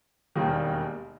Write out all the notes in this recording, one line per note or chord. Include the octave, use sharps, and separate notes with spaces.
E1 D#2 D#3 G3 A#3